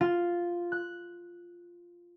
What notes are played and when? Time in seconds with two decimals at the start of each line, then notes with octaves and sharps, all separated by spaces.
0.01 F4
0.72 F#6